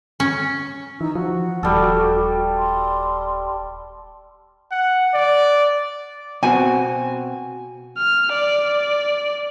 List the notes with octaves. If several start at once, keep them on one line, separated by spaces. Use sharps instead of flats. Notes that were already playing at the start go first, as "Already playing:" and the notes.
C#4
E3 D#4 E6
F3 F#4
D#1 G3 A4
C6
F#5
D5
B2 C4 F#4 G#5
F6
D5